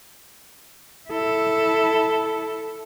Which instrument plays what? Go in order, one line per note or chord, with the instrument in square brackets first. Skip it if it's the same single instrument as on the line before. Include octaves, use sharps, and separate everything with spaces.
[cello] E4 A4